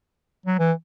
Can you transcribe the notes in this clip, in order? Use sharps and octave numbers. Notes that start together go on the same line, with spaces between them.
F#3
E3